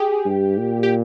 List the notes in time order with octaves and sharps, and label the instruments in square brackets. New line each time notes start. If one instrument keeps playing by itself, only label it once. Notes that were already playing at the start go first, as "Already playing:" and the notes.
Already playing: [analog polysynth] G4 G#4
[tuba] G2
A#2
[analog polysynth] G4